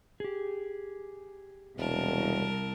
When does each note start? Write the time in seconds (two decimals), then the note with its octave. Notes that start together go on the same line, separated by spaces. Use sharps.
0.20 G4 G#4
1.78 E1 C2 A#4 A5